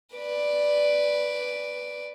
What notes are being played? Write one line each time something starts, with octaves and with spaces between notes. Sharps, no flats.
B4 D5